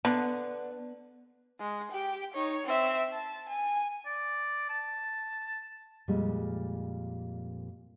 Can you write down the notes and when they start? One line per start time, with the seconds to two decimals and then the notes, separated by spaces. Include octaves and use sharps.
0.05 D3 B3
1.60 G#3
1.92 G4 G5
2.34 D#4 C#5
2.65 C4 E5
3.12 A5
3.49 G#5
4.06 D5
4.69 A5
6.08 F2 A#2 G3 G#3